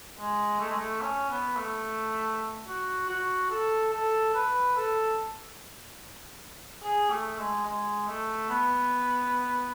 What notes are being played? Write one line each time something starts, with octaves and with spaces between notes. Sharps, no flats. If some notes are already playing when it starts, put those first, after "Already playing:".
G#3
A3
G#3
A3
C#4
B3
A3
F#4
F#4
A4
A4
B4
A4
G#4
A3
G#3
G#3
A3
B3